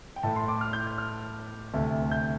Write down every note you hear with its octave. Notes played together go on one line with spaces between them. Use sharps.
G5
A2 A3 A5
C6
D6
F6
G6
G6
F6
D2 C3 A3
G6